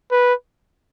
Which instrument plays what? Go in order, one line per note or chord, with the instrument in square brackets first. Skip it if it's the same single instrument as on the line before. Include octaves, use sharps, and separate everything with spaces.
[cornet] B4